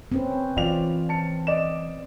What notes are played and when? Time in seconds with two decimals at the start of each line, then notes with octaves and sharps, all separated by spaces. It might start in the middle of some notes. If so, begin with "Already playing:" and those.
0.12 C4 C#4 B4
0.57 E3 F4 D5 F7
1.09 A5 C#7
1.47 D5 D#5 E7